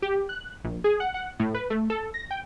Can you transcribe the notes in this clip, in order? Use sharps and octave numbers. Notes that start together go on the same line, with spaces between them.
G4
F#6
A#1
G#4
F#5
F#5
A2
B4
A3
A4
A#6
G5